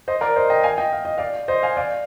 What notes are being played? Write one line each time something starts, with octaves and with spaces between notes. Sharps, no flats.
C5 D#5
A#4 D5
C5 D#5
D#5 G5
F5 G#5
D#5 G5
F5
D#5
D5 F5
C5 D#5
F5 G#5
D5 F5